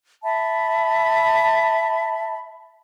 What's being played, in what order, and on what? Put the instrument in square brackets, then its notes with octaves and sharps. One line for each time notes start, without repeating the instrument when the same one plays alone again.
[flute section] E5 A5 B5